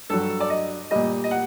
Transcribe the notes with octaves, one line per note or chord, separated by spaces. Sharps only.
G2 F#3 A4
D5
D#5
A#2 G3 D#5
D#5
F#5